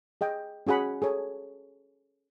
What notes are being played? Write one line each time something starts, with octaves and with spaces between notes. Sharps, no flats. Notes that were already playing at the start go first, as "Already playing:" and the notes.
G#4 D#5 G5
C#4 F#4 G#4 F#5 B5
G#4 A4 C#5